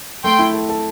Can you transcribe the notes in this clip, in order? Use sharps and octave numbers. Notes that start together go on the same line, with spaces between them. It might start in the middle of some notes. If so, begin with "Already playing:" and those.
A3 G5 C6
E4
A4
A4